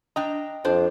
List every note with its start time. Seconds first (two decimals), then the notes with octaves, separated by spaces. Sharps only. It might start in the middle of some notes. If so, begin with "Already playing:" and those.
0.16 D4 D#5 G5 A#5
0.64 F2 D4 F4 C5